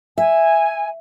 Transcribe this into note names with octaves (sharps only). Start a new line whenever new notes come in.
E5 G#5